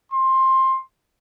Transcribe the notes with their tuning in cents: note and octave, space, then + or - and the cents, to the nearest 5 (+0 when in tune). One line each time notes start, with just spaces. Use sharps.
C6 +15